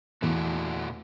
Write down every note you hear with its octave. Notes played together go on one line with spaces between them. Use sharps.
E2 A#2 A3 F#4